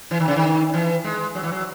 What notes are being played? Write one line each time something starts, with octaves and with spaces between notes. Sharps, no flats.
E3
D#3
C#3
D#3
E3
G#3
F#3
E3
F#3